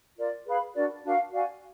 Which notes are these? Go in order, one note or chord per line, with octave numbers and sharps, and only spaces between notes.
F4 A#4 D5
G#4 B4 F5 B5
D4 F#4 A#4 D5
D4 F#4 A#4 F5
F#4 D5 F5 G#5